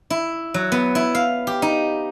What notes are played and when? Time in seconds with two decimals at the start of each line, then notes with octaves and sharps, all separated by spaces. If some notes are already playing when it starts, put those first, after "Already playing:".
0.10 E4
0.54 F#3
0.72 B3
0.95 E4
1.15 F5
1.47 G4
1.62 D#4